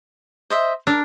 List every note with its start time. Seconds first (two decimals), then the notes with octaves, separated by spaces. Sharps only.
0.50 C5 D#5 E5
0.87 D4 A#4